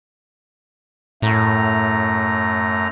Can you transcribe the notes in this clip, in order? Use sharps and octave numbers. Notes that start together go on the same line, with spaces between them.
F#2 A2 A3 A#5